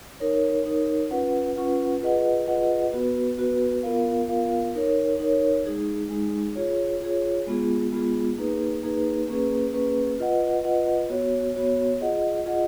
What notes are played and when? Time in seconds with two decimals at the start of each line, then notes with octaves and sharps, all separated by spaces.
0.20 D#4 A#4 C#5
0.66 D#4 A#4 C#5
1.11 C#4 F4 B4 F#5
1.56 C#4 F4 B4 F#5
2.01 F4 G#4 B4 D#5 F#5
2.48 F4 G#4 B4 D#5 F#5
2.93 B3 F#4 B4
3.38 B3 F#4 B4
3.83 B3 F4 A#4 F5
4.29 B3 F4 A#4 F5
4.75 D#4 A#4 C#5
5.19 D#4 A#4 C#5
5.66 G#3 D#4 G#4
6.10 G#3 D#4 G#4
6.56 F4 G#4 C#5
7.01 F4 G#4 C#5
7.47 G#3 B3 F4 G#4
7.92 G#3 B3 F4 G#4
8.38 A#3 D#4 G#4 B4
8.83 A#3 D#4 G#4 B4
9.28 A#3 C#4 G#4 B4
9.73 A#3 C#4 G#4 B4
10.19 F4 B4 D#5 F#5
10.64 F4 B4 D#5 F#5
11.09 B3 F#4 C#5
11.56 B3 F#4 C#5
12.01 F4 G#4 D#5 F#5
12.46 F4 G#4 D#5 F#5